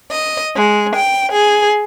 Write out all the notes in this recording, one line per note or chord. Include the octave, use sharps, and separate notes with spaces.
D#5
G#3
G5
G#4